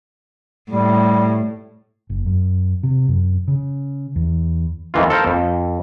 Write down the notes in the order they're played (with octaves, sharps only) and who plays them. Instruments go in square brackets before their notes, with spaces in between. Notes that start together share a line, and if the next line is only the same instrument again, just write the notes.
[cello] A2 [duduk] G3
[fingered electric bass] F#1
F#2
C3
F#2
C#3
E2
[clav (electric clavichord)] F2 D#3 E3 F4
A4 A#4 C5 F5
F2